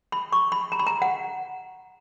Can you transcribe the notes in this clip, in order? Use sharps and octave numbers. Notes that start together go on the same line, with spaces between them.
B5
C#6
B5
A#5
B5
A#5
F#5